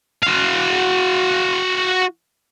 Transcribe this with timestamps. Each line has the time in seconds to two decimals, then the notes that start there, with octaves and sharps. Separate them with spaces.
0.23 F#4 F5